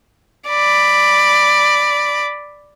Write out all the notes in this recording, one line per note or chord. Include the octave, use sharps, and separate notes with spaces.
D5 B5